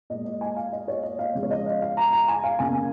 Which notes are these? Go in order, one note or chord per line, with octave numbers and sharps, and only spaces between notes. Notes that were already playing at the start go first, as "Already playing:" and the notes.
A#2 G#3 D#5
D#5
G#5
F5
D#5
C#5
D#5
F5
C#3 F3 G#3
C#5
D#5
F5
F5
A#5
A#5
G#5
F5
C#3 A#3 G#5